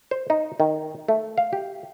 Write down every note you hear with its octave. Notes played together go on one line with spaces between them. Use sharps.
C5
D#4
D#3
A3
F5
G4